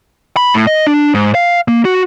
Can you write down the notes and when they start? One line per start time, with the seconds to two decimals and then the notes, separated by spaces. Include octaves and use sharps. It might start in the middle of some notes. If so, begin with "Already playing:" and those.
0.37 B5
0.54 A2
0.67 D#5
0.87 D4
1.14 G#2
1.35 F5
1.68 A#3
1.85 F#4